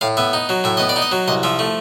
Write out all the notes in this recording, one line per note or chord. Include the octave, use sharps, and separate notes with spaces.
A2 F5
B3 E5
D#4
F#3
A2 E5
B3 D#5
D5
D#4
D#5
F#3
C2 D#5
F3 E5
A3